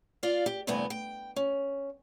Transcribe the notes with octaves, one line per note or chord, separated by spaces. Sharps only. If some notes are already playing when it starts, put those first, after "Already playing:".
F4 D5 F5
G4
E2 G2 C3 A3 B3 G#5
G5
C#4